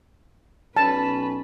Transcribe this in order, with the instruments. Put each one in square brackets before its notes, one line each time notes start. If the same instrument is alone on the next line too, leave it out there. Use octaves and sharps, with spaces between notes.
[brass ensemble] B1 C#4 [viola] B4 [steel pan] A5